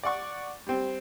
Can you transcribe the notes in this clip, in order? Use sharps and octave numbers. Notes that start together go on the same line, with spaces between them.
D5 F#5 C#6
G3 C4